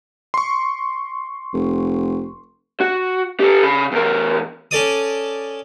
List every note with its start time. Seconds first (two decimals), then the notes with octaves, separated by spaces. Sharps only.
0.34 C6 C#6
1.53 F1
2.81 F#4
3.40 G4 A4
3.63 C#3 B5
3.92 E2 A#4
4.71 C#4 A4 D5 D#6